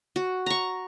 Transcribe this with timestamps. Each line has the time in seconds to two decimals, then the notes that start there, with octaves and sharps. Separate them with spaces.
0.16 F#4
0.46 A#5 C#6